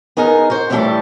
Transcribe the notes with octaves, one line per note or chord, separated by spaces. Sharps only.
B3 D#4 G#4 A#4
F#4 C5
F2 A2 E3 G3 A3 A5